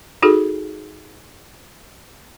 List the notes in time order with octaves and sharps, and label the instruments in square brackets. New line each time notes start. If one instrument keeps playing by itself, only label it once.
[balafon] D#4 F#4 G#4 A4